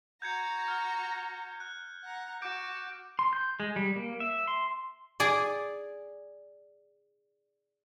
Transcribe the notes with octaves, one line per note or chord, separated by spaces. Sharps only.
F#4 A#5 G6 G#6 C#7
F6
F#6
F#5 A#5
F#4 D6 G6 D7
C6
G6
G#3
G3
A#3
E5
C6
G#4 D5